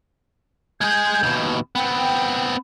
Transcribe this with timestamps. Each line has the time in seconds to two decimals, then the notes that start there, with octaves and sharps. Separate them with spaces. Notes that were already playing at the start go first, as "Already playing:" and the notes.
0.81 G#3 G#4 G6 G#6
1.23 D#2 B2
1.75 B3 C4 G5